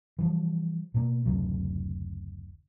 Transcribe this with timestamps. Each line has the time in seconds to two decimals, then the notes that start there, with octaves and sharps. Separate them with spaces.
0.19 E3 F3 G3
0.94 B2 A#3
1.26 F#1 D2 C3 F#3